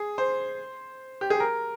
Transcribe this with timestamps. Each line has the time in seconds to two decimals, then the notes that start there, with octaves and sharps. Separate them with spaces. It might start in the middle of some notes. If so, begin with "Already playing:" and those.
Already playing: G#4
0.18 C5
1.21 G4
1.30 G#4
1.40 A#4